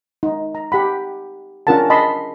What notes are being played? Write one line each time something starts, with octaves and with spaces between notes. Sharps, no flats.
D#4
A#5
G4 F#5 B5
C#4 D4 F4 A#4 F#5 A5
D#5 A5 B5 C6